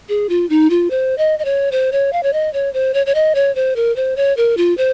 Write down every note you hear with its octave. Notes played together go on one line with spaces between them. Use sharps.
G#4
F4
D#4
F4
C5
D#5
D#5
C#5
C5
C#5
F5
C#5
D#5
C#5
C5
C#5
C#5
D#5
C#5
C5
A#4
C5
C#5
A#4
F4
C5